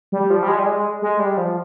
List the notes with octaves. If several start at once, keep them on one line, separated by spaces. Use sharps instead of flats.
G3
F3
G3
G#3
G3
G#3
G#3
G3
F3